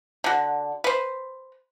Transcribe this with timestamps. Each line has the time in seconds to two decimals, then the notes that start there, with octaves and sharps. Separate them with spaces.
0.24 D3 F#4
0.84 B4 C5